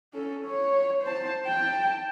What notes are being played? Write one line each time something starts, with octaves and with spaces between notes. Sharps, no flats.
C#4 A4
C#5
C5 A5
G5 A5